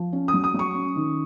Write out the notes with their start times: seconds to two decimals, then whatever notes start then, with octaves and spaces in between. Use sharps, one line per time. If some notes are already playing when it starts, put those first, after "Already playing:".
Already playing: F3
0.13 C#4
0.28 D#6
0.34 F#3
0.44 D#6
0.54 F#3 C#6
0.75 C#4
0.96 D#3